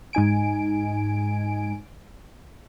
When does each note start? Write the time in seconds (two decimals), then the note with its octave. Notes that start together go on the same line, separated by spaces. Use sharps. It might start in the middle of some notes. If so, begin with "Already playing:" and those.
0.13 G#2 D#4 G#5 D7